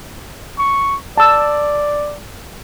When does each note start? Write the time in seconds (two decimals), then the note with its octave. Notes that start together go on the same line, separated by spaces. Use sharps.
0.59 C#6
1.18 D5 A5 E6